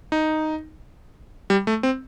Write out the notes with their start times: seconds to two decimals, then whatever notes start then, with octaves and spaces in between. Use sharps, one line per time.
0.12 D#4
1.50 G3
1.67 A3
1.83 C4